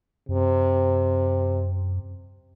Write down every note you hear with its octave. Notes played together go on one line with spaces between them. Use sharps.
F#2 C3